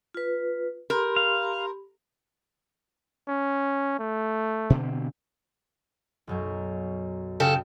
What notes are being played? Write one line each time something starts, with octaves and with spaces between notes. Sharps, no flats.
F4 B4
G4 A#4 B5 C6
F5
C#4
A3
B2 D3 C4
B1 F#2 F#3
C#3 G4 A4